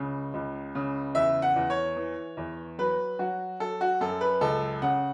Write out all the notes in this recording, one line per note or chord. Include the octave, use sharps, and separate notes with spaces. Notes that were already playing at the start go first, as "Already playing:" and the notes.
Already playing: C#2 C#3
C#2
C#3
E2 E5
F#5
E2
C#5
E3
E2
F#3 B4
F#3 F#4
F#3 A4
F#4
F#2 A4
B4
C#2 A4
C#3 F#5